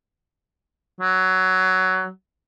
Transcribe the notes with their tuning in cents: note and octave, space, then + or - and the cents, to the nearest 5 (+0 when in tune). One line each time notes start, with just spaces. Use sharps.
F#3 +15